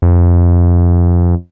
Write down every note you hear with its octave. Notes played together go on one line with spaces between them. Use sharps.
F2